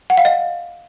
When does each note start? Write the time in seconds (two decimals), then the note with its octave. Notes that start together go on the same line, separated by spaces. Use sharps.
0.10 F#5
0.17 F5
0.25 D#5